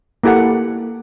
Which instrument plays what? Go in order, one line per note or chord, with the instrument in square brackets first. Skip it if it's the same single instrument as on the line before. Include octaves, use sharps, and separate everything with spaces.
[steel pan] A#3 E4 G4 A4 F#5